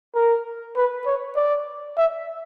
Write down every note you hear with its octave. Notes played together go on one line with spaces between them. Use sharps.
A#4
B4
C#5
D5
E5